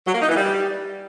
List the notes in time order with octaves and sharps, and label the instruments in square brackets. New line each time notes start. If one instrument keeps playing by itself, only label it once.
[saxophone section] F#3
A#3
D#4
E3
G3